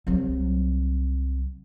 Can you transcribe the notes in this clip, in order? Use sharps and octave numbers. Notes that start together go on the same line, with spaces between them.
C2 F#3